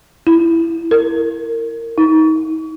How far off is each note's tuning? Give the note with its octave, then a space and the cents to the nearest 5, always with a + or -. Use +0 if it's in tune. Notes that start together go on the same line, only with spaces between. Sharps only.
E4 +10
A#4 -20
D#4 +35